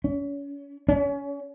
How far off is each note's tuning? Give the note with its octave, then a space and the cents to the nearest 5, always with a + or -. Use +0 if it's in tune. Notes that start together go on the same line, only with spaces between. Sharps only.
C#4 +35
C#4 +30